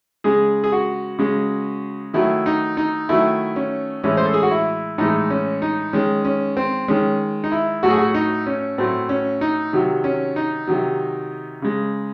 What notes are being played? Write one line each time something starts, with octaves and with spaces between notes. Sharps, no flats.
C#3 G#3 G#4
G#4
F#4
C#3 G#3
D#3 F#3 A3 E4
D#4
D#4
D#3 F#3 A3 E4
C#4
A2 E3 G#3 C#4
C5
A4
G#4
F#4
E4
A2 E3 G#3 D#4
C#4
D#4
D#3 G#3 C#4
C#4
C4
D#3 G#3 C#4
D#4
E4
A2 F#3 A3 F#4
G#4
F#4
D#4
C#4
A2 F#3 A3 C4
C#4
D#4
C3 D#3 F#3
C#4
D#4
C3 D#3 F#3
C#3 G#3